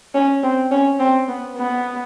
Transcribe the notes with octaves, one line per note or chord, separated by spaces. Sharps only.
C#4
C4
C#4
C4
B3
B3